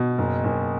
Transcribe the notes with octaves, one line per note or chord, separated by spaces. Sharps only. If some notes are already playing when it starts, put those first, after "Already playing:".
Already playing: B2
F#1
F#1